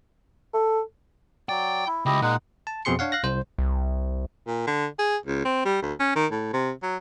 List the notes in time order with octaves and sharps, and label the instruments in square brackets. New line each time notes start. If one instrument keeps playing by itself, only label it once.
[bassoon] A4
[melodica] F#3 D5 [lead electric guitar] G5
[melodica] E4
[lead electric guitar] C#2 [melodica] E4 G4 D#5
[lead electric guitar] A#2 [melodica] G#3 D#4 F#5
[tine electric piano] A5
F2 B2 C4 G#4 C6 C#7
D4 C#5 F5 F#5
F5 F#6 A#6
C2 C5
[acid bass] C2
[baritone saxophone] A#2
D3
G#4
C#2
C4
G3
D2
C#4
D#3
A2
C3
F#3